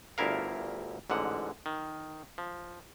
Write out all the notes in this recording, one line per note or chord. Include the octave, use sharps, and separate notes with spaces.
G1 D2 E4 A#4 F5
A1 G#2 D3 F#5
D#3
F3